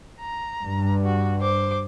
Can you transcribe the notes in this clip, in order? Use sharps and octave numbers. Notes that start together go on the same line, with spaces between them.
A#5
G2
F#4
C5 D6